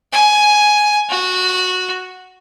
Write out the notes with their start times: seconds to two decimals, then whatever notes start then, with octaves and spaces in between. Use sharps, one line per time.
0.12 G#5
1.10 F#4